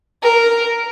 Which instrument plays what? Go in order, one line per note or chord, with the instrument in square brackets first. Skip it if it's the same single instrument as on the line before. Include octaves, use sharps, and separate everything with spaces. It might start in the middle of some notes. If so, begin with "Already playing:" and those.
[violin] A#4